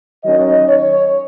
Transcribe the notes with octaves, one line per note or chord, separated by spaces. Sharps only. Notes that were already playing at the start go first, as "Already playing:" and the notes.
D#3 F#3 C#4 D#5
C#5